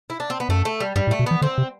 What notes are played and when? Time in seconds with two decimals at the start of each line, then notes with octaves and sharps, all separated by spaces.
0.10 E4
0.20 D4
0.30 C4
0.40 B3
0.49 F#2 A3
0.65 A3
0.80 G3
0.96 G2 G3
1.07 A2
1.11 A3
1.19 B2
1.26 E3 B3
1.42 D3 C4
1.58 C3